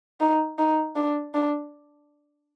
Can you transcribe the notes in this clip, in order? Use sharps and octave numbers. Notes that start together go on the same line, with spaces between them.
D#4
D#4
D4
D4